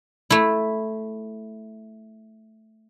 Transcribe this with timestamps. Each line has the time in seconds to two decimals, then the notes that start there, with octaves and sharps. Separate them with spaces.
0.30 A3 E4